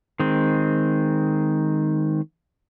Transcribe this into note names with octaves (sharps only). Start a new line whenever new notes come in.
D#3 G#3 C4